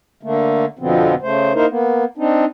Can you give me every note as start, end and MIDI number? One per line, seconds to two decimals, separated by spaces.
0.23 0.65 50
0.23 0.65 57
0.23 0.65 58
0.79 1.14 41
0.79 1.14 47
0.79 1.14 50
0.79 1.14 53
0.79 1.14 59
0.79 1.14 60
1.22 1.53 49
1.22 1.53 57
1.22 1.53 72
1.54 1.66 58
1.54 1.66 63
1.54 1.66 64
1.54 1.66 70
1.54 1.66 72
1.69 2.04 58
1.69 2.04 59
2.18 2.45 60
2.18 2.45 62
2.18 2.45 63